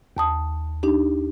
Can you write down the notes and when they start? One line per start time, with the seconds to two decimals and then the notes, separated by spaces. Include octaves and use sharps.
0.17 D#2 A5 D#6
0.83 D4 D#4 G4